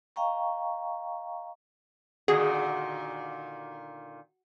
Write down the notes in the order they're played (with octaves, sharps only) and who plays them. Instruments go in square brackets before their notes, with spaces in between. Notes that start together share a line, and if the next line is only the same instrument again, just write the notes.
[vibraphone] D#5 F5 G5 A#5 C#6
[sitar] A#2 D3 D#3 [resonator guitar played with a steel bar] F#4 [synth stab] G#4